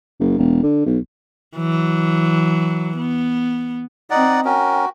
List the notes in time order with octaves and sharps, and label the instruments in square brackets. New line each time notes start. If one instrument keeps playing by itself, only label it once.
[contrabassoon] F#1
E1
D3
B1
[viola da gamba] E3 F#3
B3
[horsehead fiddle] C4 D#5 [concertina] D#4 [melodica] D5 F#5
[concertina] C#4 A#4 [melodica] F#4 [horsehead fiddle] G5